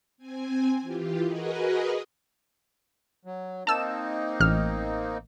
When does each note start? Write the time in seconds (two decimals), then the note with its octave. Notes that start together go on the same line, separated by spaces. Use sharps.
0.18 C4 G#5
0.82 E3 F4 G4
1.22 F#4 G#4 A#4 B4 D#5
3.25 F#3
3.67 A#3 C4 D#4 A5 E6 E7
4.40 A1 F6